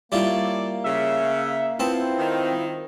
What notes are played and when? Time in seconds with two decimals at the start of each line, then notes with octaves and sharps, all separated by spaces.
0.12 G3 A#3 E4 F4 A4 C#5 D5
0.84 C#3 E5
1.80 B3 C4 E4 F4 A5 B5
2.18 D#3